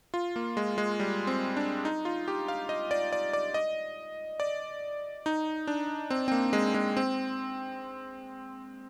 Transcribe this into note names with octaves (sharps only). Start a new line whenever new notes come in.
F4
A#3
G#3
G#3
G3
C4
D4
D#4
F4
G4
F5
D#5
D5
D5
D5
D#5
D5
D#4
D4
C4
C4
A#3
G#3
G#3
C4